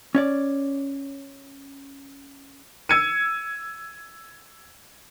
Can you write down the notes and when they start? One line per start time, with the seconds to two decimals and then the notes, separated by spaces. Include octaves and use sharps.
0.15 C#4 C#5 D5
2.89 E6 G#6 C#7 D#7